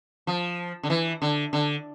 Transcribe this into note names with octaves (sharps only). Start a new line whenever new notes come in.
F3
D3
E3
D3
D3